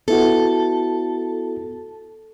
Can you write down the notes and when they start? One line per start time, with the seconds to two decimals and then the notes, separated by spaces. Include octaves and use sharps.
0.08 B3 E4 F#4 A4